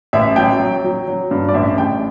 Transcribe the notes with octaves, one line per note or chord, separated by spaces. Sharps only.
A1 E5
F#3 G5
F#3
F#3
F#3
G2
D5
A1 E5
A1 G5